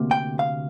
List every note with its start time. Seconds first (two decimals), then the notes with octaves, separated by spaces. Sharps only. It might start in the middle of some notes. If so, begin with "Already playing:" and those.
Already playing: D2 C3 A#3
0.11 G5
0.39 F5